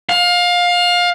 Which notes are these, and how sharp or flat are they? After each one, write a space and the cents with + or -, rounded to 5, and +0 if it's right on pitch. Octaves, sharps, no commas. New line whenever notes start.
F5 +25